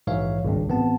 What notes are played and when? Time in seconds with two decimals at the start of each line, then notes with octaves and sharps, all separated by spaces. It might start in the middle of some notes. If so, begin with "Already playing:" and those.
0.07 A#1 G#2 E3 C#5 E5 F5
0.45 G#1 C#2 G2
0.69 A1 B3 C4 A5